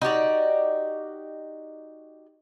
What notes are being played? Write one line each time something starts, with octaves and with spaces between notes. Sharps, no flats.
D#4 F#4 G4 D5